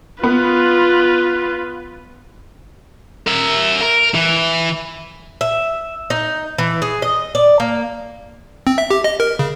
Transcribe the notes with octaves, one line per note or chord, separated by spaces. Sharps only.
B3 F4 B4
A#4 E5
A#4
E3
E5
D#4
E3
G#4
D#5
D5
A#3
C4
E5
G4
D#5
A#4
C#3